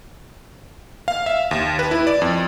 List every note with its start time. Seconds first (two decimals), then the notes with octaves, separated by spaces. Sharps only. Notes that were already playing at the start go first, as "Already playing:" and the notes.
1.08 F5
1.26 E5
1.51 D#2
1.79 B4
1.91 E4
2.07 D5
2.22 F2